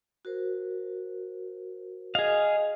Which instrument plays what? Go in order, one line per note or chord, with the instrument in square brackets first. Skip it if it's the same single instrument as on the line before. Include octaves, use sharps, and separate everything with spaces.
[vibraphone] F#4 A#4 C5
[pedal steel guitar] G#4 F5 [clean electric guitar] D#5